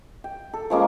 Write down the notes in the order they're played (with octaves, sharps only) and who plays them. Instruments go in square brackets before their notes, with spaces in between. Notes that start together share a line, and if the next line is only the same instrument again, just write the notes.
[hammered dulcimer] G5
A4
F3 G#3 A#3 C#4